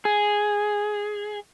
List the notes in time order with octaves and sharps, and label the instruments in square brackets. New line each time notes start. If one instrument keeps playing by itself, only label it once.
[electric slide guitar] G#4